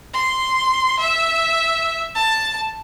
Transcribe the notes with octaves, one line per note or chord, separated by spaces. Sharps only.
C6
E5
A5